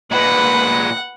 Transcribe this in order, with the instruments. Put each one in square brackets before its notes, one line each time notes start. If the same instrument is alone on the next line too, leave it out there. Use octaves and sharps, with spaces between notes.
[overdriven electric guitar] A#2 G#3 [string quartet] B4 [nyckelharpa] F#5